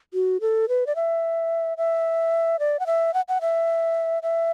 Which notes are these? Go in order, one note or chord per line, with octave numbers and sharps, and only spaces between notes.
F#4
A4
B4
D5
E5
E5
D5
F#5
E5
F#5
F#5
E5
E5